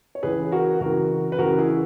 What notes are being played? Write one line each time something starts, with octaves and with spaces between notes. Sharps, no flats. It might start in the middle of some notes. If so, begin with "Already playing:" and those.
C#5
C#2 C#3 E3 G#4 B4
F#4 A#4
C#2 C#3 E3 F#4 A#4
B4
C#2 C#3 E3 F#4 A#4
E4 G#4